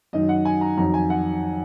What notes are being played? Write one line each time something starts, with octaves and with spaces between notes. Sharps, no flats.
F#2 D#3 F#3 D#5
F#5
G#5
A#5
F2 D#3 F#3 A#5
G#5
F#5